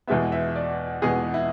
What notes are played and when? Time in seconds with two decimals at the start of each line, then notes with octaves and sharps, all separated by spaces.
0.07 E2 B2 G#3 B3 E5
0.32 E5
0.56 D5
1.02 E2 B2 G#3 B3 G#4
1.34 E4